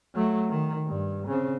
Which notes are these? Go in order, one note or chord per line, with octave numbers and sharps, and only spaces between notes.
F#3 A3
D#3
G2
C#3 C4